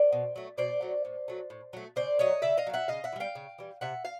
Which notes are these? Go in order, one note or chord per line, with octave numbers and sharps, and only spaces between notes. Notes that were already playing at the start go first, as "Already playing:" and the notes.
Already playing: C5 D5
B2
F#3 A3
B2 C5 D5
F#3 A3
A2
F#3 A3
A2
F#3 A3
C#3 C5 D5
F#3 A3 C#5 D#5
C#3 D5 E5
D#5 F5
F#3 A3
E5 F#5
C#3 D#5 F5
E5 F#5
E3
G3 F5 G5
C#3
E3 G3
C3 E5 F#5
F5